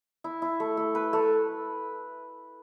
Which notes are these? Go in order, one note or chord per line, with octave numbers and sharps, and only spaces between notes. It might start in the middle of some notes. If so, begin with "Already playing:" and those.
E4
E4
A3
A3
B4
A3